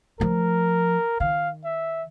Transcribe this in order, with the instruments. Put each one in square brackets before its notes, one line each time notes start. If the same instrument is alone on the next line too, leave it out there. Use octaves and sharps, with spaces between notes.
[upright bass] F3 A3 [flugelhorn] A#4
[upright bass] D#3 [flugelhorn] F5
[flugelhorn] E5